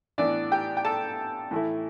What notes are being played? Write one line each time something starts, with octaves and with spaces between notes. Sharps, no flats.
A2 E3 B3 D4 D5
G4 G5
G5
A4 A5
A2 E3 A3 E4